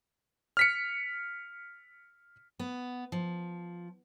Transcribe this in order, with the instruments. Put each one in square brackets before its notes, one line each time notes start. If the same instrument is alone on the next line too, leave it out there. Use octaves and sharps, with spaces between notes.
[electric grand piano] F6 B6 C#7
[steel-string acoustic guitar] B3
F3